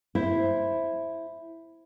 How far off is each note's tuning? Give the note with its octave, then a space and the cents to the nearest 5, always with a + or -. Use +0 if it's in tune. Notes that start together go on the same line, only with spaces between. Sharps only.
E4 +0 C5 +0